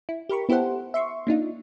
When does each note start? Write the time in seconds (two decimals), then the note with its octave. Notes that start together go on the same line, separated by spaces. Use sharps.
0.09 E4
0.29 G4 A#4 B5 C#6
0.49 B3 E4 G4 A4 C5 F#5
0.94 E5 C6 C#6
1.27 A#3 D4 D#4 F4